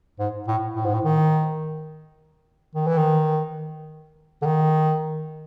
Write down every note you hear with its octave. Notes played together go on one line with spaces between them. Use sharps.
G#2
A2
A2
G#2
A2
D#3
D#3
E3
D#3
D3
D#3